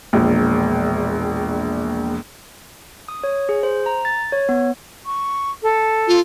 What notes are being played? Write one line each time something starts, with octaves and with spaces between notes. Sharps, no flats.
E1 A#1
D#6
C#5
G#4
C5
A#5
A6
C#5
B3
C#6
A4
F4